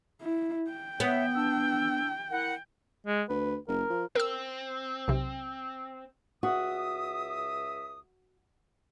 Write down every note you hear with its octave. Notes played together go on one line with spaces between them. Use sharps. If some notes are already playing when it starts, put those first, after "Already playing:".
E4
G5
B3 C#5 E5
D4 E6
E4 A#4 F#5
G#3
D2 B4
F#1 A#4
F3
C4 A#4 E6
B1 C3
C#2 F#4 E5 D#6